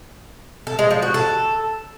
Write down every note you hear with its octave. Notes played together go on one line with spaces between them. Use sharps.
A4
G#3
F3
F#4
A4